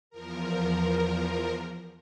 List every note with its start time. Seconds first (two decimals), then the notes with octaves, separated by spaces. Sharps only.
0.10 E2 F3 A#4